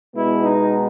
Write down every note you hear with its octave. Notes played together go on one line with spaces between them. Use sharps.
B2 G#3 B3 E4
D#4